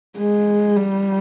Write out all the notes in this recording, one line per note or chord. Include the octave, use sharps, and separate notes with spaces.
G#3
G3